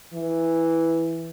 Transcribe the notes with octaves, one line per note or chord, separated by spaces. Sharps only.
E3